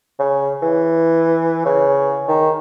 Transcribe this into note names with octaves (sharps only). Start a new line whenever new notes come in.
C#3
E3
C#3
D#3